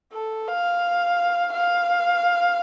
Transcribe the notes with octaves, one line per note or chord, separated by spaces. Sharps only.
A4
F5
F5